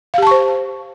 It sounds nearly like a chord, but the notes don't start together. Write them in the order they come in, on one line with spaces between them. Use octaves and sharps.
F5 G4 A5 C#6 C5